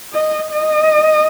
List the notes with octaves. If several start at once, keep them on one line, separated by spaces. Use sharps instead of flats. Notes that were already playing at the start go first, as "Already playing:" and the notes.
D#5
D#5